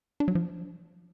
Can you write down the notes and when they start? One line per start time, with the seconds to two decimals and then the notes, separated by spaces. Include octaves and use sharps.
0.20 D4
0.28 F#3
0.35 F3